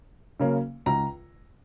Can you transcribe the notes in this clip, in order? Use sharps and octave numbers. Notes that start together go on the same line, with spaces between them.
C#3 F#3 A#3 C#4
C#2 A#5